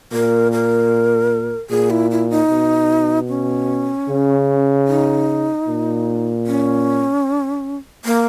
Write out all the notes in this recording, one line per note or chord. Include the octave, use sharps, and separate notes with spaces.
A#2 A#4
A#4
A#2 G#4
E4
E4
D#4
B2
C#4
C#3
D#4
A#2
C#4
A#3